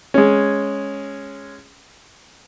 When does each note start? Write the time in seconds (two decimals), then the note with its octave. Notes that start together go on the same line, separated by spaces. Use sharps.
0.14 G#3 C#4